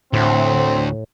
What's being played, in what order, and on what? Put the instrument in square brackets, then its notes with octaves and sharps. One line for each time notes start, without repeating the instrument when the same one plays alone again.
[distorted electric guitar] D2 [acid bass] A2 [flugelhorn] C4